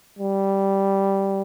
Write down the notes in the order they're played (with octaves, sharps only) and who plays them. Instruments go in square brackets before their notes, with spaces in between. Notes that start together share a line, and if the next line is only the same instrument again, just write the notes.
[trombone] G3